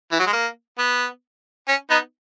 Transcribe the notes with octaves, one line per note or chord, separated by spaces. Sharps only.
E3
F#3
G#3
A#3
B3
C#4
B3 D#4